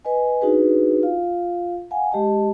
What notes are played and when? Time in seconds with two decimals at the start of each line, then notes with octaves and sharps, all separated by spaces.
0.05 B4 D#5 G#5
0.41 D4 D#4 F#4 G#4 B4
1.03 F4 F5
1.91 F5 F#5 G#5
2.12 G#3 G4 D#5 A5